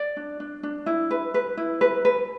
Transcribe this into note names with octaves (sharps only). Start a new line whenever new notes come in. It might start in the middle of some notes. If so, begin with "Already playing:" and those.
Already playing: D5
D4
D4
D4
E4
B4
B4
E4
B4
B4